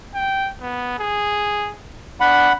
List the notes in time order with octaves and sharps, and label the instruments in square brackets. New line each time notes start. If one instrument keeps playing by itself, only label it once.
[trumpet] G5
B3
G#4
[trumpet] D4 [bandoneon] F#5 B5